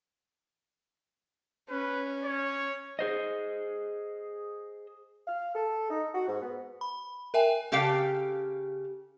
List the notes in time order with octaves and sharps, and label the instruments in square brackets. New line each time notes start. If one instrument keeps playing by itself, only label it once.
[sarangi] C#4 [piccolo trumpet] B4
[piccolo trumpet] C#5
[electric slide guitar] G#4 C5 D#5
[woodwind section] F5
A4
D#4
F#4
G#2
B3
[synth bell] B5
A#4 E5 G5 G#5
[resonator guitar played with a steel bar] C#3 G4 A4 F5 G5